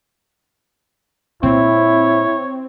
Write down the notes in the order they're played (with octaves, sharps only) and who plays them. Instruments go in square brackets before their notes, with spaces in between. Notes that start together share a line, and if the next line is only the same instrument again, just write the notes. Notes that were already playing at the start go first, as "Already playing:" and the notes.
[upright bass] A#2 [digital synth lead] C4 [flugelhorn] E4 [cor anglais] C#5